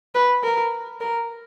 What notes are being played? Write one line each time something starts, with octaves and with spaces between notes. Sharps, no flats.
B4
A#4
A#4